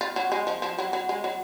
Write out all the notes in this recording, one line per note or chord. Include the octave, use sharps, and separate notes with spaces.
F4
F#3
G#3
F3
F3
F#3
F#3
G#3
F#3